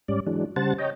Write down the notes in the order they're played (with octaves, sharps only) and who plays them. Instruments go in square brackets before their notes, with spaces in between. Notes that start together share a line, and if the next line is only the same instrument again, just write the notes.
[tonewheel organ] G#2 G3 C#4 D5
E3 F#3 G#3 D4
C#3 G3 C5 F#5 A5 A6
C#5 D#5 G5 A#5